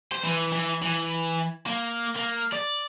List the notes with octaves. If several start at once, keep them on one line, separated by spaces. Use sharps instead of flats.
C5
E3
E3
E3
A#3
A#3
D5